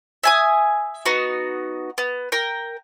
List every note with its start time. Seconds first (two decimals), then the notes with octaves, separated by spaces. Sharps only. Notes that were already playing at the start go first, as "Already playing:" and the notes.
0.23 E5 G#5 D#6
1.05 B3 D#4 F#4
1.98 B3
2.32 A#4 G5